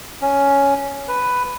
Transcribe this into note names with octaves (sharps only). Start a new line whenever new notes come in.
C#4
B4